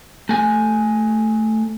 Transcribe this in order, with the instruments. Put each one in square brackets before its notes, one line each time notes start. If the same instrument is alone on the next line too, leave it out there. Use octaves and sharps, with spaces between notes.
[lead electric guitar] A3 G#5